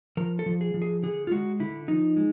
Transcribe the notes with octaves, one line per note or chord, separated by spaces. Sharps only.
F3 A#4
A4
F3
G#4
F3
G#4
D3 G#4
F4
G#3 F#4
D3 E4
F3 D#4
G#3